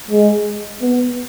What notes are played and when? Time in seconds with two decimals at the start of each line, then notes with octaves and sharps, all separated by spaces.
0.11 G#3
0.81 B3